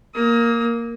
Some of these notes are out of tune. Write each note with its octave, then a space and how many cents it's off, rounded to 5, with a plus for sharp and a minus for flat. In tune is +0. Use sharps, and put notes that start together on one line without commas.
A#3 +0 D#6 +35